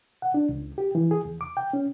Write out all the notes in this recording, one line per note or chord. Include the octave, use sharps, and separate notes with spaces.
F#5
D4
C#2
G4
E3
G#4
E2
D6
G5
C#4